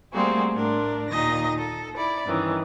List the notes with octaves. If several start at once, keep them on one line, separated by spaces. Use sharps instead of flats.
G3 A3 A#3 C4 F#4 G#4
A2 D4 A#4
D#2 A#2 D#3 D#4 D#5 A#6
A4
E4 D5
G2 D#3 E3 C#4